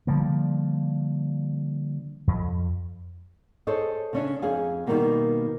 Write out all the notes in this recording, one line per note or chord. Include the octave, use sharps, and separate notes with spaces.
D3 F3 G3 A#3
F2
G#4 A4 C5 C#5 D#5
C#3 C#4 D4
F2 G#4 F5 G#5
B2 D3 D#3 G3 A#3 B3